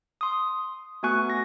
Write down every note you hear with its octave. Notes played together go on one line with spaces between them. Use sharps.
C6 D#6
A3 B3 F#4 G#5 C#6 F#6
A#6